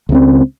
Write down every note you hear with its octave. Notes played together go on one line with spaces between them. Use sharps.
C#2 C#3 G#3
C4